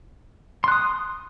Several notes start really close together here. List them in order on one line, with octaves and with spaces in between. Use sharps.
C6 F#6 D#6